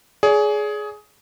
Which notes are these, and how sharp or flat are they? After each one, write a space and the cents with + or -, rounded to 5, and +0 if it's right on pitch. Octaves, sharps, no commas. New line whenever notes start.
G#4 +15 D5 -45